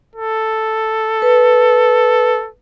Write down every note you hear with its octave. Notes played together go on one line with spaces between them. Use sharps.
A4
B4